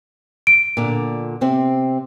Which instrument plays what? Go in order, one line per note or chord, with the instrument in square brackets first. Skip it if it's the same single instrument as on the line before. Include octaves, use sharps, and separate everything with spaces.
[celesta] D7
[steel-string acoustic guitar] A#2 D3
C3 C4